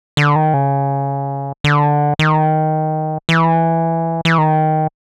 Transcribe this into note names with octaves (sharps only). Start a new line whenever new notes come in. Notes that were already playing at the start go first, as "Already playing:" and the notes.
D3
D#3
C#3
D3
D#3
E3
E3
D#3